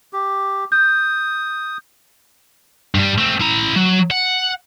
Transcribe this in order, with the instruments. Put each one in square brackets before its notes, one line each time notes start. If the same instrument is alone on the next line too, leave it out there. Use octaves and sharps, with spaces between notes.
[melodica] G4
[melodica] D#6 [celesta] G6
[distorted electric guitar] G2 G3
A3 C4
E4 A#5
F#3
F#5